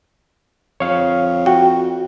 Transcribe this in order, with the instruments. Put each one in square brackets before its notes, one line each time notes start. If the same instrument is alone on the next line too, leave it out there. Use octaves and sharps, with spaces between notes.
[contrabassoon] F2 [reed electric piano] C#5 F5
[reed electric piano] F#4 [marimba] G5